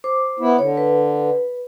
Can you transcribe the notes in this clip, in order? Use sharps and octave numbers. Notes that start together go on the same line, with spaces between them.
C5 D6
B3 E4
D3 C#5
B4